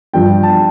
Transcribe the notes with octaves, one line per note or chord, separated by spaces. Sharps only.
G2 F3 G5
A5